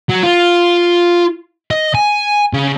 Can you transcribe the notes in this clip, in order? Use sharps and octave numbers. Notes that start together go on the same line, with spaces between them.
F#3
F4
D#5
G#5
C#3